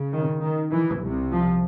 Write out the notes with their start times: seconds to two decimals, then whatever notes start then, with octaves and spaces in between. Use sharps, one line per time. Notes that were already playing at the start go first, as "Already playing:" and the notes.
Already playing: C#3
0.13 D#3
0.42 D#3
0.72 E3
1.01 C2 C3
1.31 F3